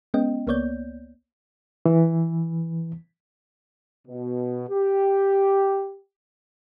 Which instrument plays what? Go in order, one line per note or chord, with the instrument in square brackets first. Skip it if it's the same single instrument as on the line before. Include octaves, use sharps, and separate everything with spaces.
[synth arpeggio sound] G#3 B3 C#4 D#5 G5
C#2 A#3 B3 C#5 D5 G6
[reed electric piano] E3
[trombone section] B2
G4